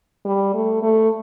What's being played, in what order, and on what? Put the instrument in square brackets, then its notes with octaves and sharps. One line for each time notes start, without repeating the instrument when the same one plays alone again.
[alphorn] G3
A3
A3